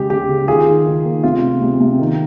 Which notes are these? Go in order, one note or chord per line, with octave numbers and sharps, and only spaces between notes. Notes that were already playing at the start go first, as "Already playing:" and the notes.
Already playing: C#3 G#3 G4
C#3 G4
C#3
D#3 F4 G#4
D#3
D#3
A#3
C3 F4
C3
C3
C3
D#3